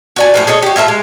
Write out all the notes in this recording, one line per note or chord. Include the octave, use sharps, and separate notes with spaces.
F#4 D5 G#5
A2 C#3 F3
G#4 A4 C#5 D#5
F#4 G4
A2 F4 E5 A5
G#3